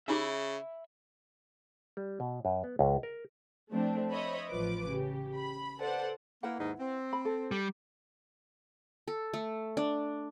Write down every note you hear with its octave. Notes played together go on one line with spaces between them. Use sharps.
C#3 C#4 D#4 G4 E5 B5
G3
B2
F#2
B3
C#2
A#4
F3 A3 C4 D4
C5 C#5 D#5 E5 B5
A1 F3 F4 B4 D6
C#3 G4
B5
A4 B4 C5 D5 F#5
A#3 E4 B4 F#5
D#2 G#2 D#4
C4
B5
A4
G3
A4
A3
D4